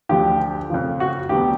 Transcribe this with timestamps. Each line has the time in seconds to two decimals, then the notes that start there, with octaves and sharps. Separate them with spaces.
0.09 D2 D3 F3 G4
0.70 F2 C#3 F3
1.00 F#4
1.29 D2 D3 F#3 B3 G4